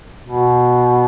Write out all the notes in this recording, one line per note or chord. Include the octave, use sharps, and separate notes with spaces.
B2